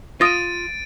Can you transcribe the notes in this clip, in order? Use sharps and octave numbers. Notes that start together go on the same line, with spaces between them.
F4 D#6 A6 A#6 D7 D#7